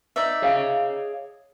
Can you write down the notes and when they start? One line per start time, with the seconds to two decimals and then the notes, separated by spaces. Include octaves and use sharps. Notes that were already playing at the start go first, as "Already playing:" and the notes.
0.16 D#4 D5 E5
0.42 G#4 C#5 F5